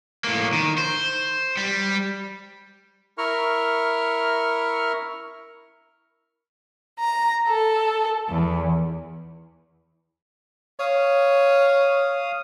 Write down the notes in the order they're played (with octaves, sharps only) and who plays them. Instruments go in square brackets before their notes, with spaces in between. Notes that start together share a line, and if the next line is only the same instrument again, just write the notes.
[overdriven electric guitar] A2 A#3
D#3
C5
G3
[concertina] E4 A#4 C#6 F6
[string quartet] A#5
A4
E2
[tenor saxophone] C#5 [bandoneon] F5 D#6